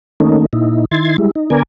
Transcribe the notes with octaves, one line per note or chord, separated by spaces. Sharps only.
D#3 A3 A#3 C#4 D#4
A#2 D#4 E4
D#3 E4 C6 G#6 A6
G3 G#3 E4
D#4
D3 B3 A#4 D5 G#5